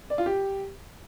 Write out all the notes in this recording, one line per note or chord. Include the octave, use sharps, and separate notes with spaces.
D5
F4
G4